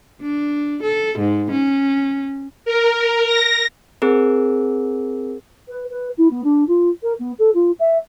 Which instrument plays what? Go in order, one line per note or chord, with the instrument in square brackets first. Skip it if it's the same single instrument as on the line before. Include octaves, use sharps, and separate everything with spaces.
[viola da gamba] D4
A4
G#2
C#4
[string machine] A#4
A#6
[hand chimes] C4 G#4 A#4
[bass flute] B4
B4
E4
B3
D4
F4
A#4
B3
A4
F4
E5